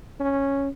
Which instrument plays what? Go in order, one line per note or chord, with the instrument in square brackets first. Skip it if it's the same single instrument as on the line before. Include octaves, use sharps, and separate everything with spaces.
[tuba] C#4